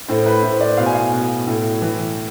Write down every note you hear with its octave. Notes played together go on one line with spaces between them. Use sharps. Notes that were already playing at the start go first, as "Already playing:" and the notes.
A2 C5
B4
A2 C5
D5
B2 F5
G#5
F5
B2
A2
E3